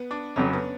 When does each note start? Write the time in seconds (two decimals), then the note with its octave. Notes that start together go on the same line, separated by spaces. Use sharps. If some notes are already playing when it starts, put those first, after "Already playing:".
Already playing: B3
0.11 D4
0.36 F1 F2 C#3 F#3 C#4
0.53 B3